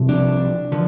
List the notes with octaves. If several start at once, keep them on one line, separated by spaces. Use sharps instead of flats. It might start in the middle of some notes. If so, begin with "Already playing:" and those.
Already playing: C2 C3 F3
D4
D3 F3